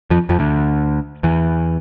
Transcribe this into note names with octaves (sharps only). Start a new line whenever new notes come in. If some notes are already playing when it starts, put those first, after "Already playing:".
F2 F3
F2 F3
D2 D3
E2 E3